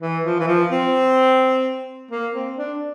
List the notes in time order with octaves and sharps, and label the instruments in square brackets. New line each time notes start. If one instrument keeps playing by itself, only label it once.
[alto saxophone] E3
F3
E3
F3
C4
A#3
C4
D4